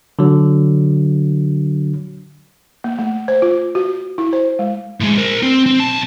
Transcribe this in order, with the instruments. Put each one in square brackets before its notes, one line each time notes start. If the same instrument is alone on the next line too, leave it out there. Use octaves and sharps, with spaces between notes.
[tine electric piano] D3 F#3
[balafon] A#3
A3
C5
F4
F#4
E4
C5
G#3
[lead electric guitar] A2 G#3
A#4 C5
C4
C4
B1 A5